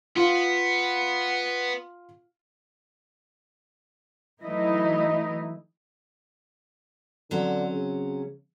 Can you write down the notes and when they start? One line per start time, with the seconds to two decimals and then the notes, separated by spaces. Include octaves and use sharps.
0.16 B3 F4 F5
4.43 E3 F#3 A3 D#4 E4 D#5
7.31 D3 F#3 C4 C#4
7.72 C#3